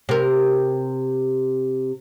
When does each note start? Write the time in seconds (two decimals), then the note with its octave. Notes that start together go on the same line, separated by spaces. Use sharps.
0.09 C3 A#4